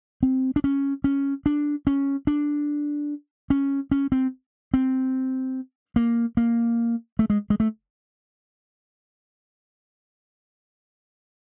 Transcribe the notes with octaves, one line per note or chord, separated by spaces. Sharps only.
C4
D4
C#4
C#4
D4
C#4
D4
C#4
C#4
C4
C4
A#3
A#3
A3
G#3
G#3
A3